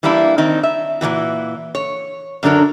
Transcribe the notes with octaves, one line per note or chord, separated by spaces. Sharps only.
E3 G3 A#3 D4 E4
D#3 C4 D#4
E5
A#2 D#3 E3 F#4
C#5
F#2 D3 F#3 D4 A#4